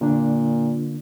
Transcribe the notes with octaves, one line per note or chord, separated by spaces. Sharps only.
A#2 D3 A#3 D4